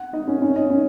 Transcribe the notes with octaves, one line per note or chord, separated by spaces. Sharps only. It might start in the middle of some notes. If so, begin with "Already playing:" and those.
Already playing: F#5
D#4 D#5
C#4 C#5
C#4 C#5
D#4 D#5
C#4 C#5